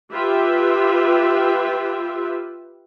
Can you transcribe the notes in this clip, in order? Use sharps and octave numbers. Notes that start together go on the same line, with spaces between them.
F4 G4 B4 E5